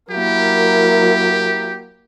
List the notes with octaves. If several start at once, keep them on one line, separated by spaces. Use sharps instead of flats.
F#3 A#3 E4 G4 A#4